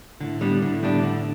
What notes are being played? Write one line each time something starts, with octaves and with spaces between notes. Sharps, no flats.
A2 D3
G3 B3 D4
D3
G3 B3 D4
D3